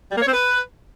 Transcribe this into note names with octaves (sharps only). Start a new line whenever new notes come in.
G3
A#3
C#5
C4
B4